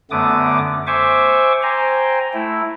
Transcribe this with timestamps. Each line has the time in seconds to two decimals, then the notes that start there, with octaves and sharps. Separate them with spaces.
0.11 F#2 D3 A3 B3 D6 D#6
0.87 C5 E5 G#5 C#6 D6
1.62 C5 G5 G#5 A#5
2.33 A3 E4